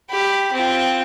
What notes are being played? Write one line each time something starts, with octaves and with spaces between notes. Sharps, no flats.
G4 B5
C4 F4